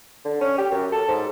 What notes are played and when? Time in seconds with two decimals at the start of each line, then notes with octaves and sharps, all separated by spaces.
0.25 D3
0.41 C#4
0.58 G4
0.72 F#2
0.92 A4
1.08 G#2